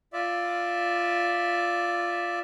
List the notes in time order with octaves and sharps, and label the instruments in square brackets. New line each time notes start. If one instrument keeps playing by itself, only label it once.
[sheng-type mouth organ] F4 D5 E5